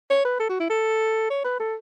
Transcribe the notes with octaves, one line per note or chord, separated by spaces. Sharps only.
C#5
B4
A4
F#4
E4
A4
C#5
B4
A4